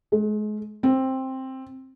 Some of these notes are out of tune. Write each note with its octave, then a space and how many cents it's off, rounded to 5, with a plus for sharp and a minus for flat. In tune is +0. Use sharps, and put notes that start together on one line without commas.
G#3 +35
C4 +10